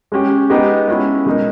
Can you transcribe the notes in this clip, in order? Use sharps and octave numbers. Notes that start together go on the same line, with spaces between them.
G#3 C#4 G4
G#3 B3 D#4 G4
G#3 C#4 E4
B2 G#3 D#4 A#4